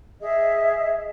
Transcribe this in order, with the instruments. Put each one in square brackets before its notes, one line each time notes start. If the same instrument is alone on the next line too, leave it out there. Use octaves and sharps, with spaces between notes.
[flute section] G#4 D#5 E5